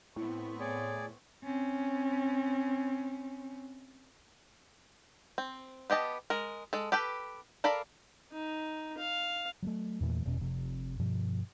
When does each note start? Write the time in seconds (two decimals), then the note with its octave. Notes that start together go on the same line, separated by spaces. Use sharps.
0.16 A2 B3 C4 E4 C#6
0.60 G#4 C#5 D5
1.44 C4 C#4
5.38 C4
5.90 B3 G4 D#5 A5
6.30 G#3 A#4
6.73 G#3 A4
6.92 G4 A4 B4 G5
7.64 A4 A#4 D5 F5 B5
8.32 D#4
8.98 F5
9.63 F#3 G#3 A3
10.00 E2 A#2 E3 A3
10.25 E1 E2 B2 C#4
10.41 F1 F2 C3
10.99 G2 B2 F3